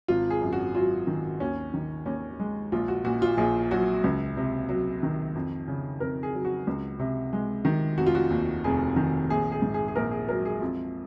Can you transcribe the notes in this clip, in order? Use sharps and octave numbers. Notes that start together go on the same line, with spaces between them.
G#1 F4
G#4
F#2
F#4
F#3 F4
D#3
D#2 C#4
D#3
D#2 C#4
G#3
A#1 F4
F#4
A#2 F#4
F4
A#1 G#4
F#3 F#4
C#2
C3
F#3
D#3
F2
C#3
F2 A#4
G#4
F#3
F#4
C#2
C3
G#3
D#3
F1 F#4
F4
F#4
D#2
F1 G#4
D#3
A#1 G#4
G#4
G#2
G#4
G#4
A#1 A#4
G#4
F#3 A#4
G#4
F2 F4